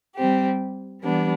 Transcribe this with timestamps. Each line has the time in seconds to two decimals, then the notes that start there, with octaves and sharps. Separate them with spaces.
0.16 G3 C4 G4
1.01 E3 G3 B3 D4